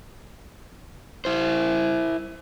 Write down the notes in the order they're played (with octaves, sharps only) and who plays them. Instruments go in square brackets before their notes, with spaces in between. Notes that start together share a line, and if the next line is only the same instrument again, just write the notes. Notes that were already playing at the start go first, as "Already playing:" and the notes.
[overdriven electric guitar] E4 C5